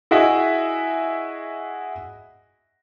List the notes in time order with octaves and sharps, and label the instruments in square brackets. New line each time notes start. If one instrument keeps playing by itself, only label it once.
[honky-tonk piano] E4 F#4 G#4 D#5 E5